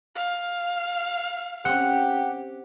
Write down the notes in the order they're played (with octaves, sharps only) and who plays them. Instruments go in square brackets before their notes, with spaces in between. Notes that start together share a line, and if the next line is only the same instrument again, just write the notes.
[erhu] F5
[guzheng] C4 C#4 [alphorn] G4 [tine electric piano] F#5